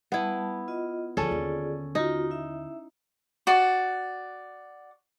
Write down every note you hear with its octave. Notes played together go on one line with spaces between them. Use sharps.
G3 B3 E4 A5
F4 D#5
D2 F3 C#4 F4 G#4 A4 D5
D#2 D3
D#4 F4 F#4
E4 E5
F#4 D5